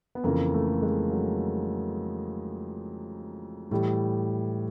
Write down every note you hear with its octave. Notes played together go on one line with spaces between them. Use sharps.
B3
F2 C#3 E3 A#3
A3
G#3
F#3
A2 E3 G3